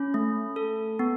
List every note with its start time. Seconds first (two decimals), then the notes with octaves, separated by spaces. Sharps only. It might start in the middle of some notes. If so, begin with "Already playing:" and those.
Already playing: C#4 B5
0.14 A3
0.56 A4
0.99 B3